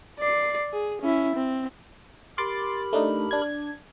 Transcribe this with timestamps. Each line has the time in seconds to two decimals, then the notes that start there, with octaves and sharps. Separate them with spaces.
0.19 D5 C7
0.73 G#4
1.02 C#4 E4
1.35 C4
2.38 G4 A#4 B5 C6 D6 A6
2.93 A3 D4 D#4
3.31 D4 G#6